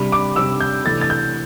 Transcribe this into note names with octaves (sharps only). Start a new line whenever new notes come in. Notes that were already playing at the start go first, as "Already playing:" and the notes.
Already playing: C3 G3 D4 B5
D6
C3 G3 D4 E6
G6
C3 E3 A3 D4 A6
A6
G6